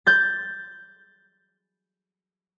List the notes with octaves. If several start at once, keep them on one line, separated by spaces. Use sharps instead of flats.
G6 A6